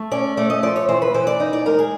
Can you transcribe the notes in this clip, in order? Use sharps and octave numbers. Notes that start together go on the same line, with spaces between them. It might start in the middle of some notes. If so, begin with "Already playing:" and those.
Already playing: A3
C#4 D5
A3 D5
D#5
F3 D5
C#5
E3 C5
B4
E3 C5
D5
D#4
D5
G#3 A#4
G#4